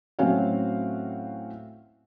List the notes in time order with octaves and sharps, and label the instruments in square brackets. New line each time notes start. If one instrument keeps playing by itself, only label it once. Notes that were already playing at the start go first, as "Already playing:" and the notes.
[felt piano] A2 F#3 C4 C#4 F#4 F5